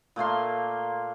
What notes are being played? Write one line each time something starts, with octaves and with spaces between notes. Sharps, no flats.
A#2 A3 A#3 C6